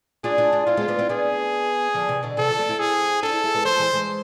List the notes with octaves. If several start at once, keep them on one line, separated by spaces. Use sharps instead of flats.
D4 F4 G#4
D4 F4
D4 F4
C4 E4 F4
G#3 B3
B3 D4
C4 E4
B3 D4 G#4
D3 F3
C3 E3
B2 D3
C3 E3 A4
D3 F3
A3 C4
C4 E4
G#4
D4 F4 A4
E4 G#4
E4 G#4
G#3 B3
F3 A3 C5
E3 G#3
E3 G#3